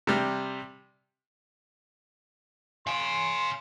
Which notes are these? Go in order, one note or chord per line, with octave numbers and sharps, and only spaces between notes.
C3 G3
F5 G#5 C6